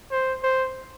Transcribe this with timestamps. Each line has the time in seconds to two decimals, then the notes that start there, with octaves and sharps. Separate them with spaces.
0.12 C5
0.43 C5